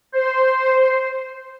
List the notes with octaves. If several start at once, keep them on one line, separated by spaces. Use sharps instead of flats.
C5